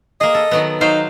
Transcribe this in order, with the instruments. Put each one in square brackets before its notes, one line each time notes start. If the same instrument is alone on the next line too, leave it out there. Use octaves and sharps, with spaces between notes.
[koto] A#3 G#4 [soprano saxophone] D#5
[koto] A4
D#3 F#3 B3
[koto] F#3 C5 F5 [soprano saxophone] D#4